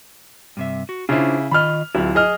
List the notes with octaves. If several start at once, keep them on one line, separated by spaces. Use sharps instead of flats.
G2 C3 E5
F#4
C#3 D4 E4 F4 C5
D#3 F4 D#5 B5 F6
D1 E4 F4
G#4 D#5 F6